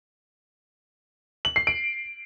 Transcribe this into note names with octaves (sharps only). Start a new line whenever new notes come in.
F#7
C7
D7